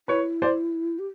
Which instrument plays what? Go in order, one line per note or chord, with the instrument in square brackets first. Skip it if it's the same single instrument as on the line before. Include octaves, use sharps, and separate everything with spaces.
[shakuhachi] E4 [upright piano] B4 C#5
[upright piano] C5 D5
[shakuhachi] G4